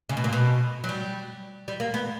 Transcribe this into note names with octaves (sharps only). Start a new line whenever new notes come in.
C#3
B2
A#2
B2
F#3
G3
G3
A#3
B3